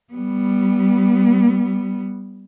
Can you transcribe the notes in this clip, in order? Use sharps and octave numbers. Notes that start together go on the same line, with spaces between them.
G3 B3